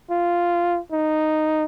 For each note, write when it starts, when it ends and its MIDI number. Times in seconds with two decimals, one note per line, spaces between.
0.11 0.78 65
0.92 1.64 63